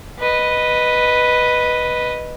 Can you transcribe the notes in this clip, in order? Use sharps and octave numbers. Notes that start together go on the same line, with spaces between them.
B4 D#5